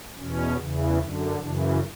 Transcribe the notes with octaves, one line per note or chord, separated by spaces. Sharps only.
E2 B2 C#4
E2 C#3 E3
F#2 D3
F#2 C#3 E3 D4